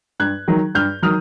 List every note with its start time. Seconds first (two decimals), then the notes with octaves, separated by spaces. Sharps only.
0.19 G2 F#6 G#6
0.48 D#3 F#3
0.75 G2 F6 G6
1.03 D#3 F#3 D#6 F6